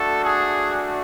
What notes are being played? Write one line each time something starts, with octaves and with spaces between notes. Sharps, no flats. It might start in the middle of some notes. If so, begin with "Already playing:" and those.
Already playing: A3 D4 F#4 A4
G#4